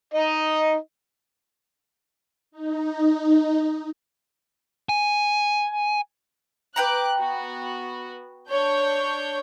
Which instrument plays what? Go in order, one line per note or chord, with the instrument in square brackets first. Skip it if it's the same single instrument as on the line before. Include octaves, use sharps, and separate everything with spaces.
[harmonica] D#4 D#5
[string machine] D#4
[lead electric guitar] G#5
[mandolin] B4 G5 A#5 [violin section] D6 F#6
[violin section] B3 F#4
D4 C#5 G6